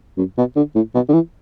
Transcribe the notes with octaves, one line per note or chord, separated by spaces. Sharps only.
F#2
B2
D3
A2
B2
D3
E3